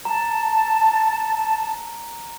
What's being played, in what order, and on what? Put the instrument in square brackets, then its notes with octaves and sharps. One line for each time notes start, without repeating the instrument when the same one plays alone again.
[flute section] A5 [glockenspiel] A#5